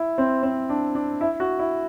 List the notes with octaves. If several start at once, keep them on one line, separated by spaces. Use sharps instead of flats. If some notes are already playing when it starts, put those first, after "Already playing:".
Already playing: E4
C4
C4
D4
D4
E4
F#4
E4